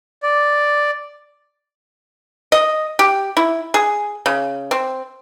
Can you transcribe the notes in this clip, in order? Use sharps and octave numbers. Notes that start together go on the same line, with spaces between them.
D5
D#5
G4
E4
G#4
C#3
C4